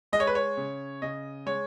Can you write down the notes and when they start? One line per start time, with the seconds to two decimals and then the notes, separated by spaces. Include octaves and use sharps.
0.13 G#3 D#5
0.20 C#5
0.27 B4
0.35 C#5
0.57 C#3
1.02 C#3 D#5
1.46 G#3 C#5